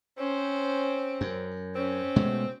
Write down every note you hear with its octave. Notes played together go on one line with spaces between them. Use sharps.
C4 C#4 C5
F#2
C4 C#4
B2 G#3 A3